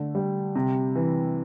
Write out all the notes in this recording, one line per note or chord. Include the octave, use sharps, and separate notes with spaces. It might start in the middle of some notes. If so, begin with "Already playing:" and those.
Already playing: D3 A3
G3
C3
E3